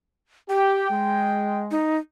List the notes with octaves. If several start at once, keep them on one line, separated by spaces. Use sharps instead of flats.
G4 G5
G#3
D#4